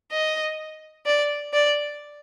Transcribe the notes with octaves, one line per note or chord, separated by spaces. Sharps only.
D#5
D5
D5